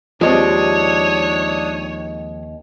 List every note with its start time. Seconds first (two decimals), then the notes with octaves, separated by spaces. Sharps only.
0.21 D#2 F3 G#3 C4 D4 C#5 D#6